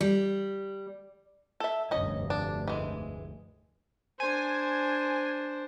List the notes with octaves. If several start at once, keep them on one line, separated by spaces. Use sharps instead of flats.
G3
A4 E5
F1 D2 G2 C#4 D#5
D4
E3 G#3
D4 C5 G#5